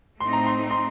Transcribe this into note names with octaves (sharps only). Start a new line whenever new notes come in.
A2 A3 C4 D#4 C6
A#5
C6
C6